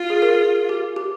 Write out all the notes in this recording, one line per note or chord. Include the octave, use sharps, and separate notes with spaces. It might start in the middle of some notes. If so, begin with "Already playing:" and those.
Already playing: F4
G#4
A#4
G#4
G4
G4